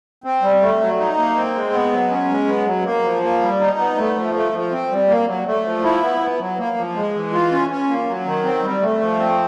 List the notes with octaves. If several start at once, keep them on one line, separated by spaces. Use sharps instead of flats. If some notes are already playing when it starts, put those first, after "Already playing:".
C4
G3
A3
F#3
D#4
A#3
C4
G#3
B3
F#3
C#4
G#3
B3
F#3
A#3
F3
A#3
G3
D#4
B3
A3
F3
A3
F3
C4
G3
A#3
F#3
A3
F3
E4
B3
B3
F#3
A#3
F3
G#3
E3
F4
C#4
C#4
A#3
F#3
D#3
C4
G3
A3
F3
C4